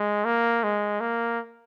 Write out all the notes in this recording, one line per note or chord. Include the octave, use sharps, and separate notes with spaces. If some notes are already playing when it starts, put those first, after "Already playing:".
Already playing: G#3
A#3
G#3
A#3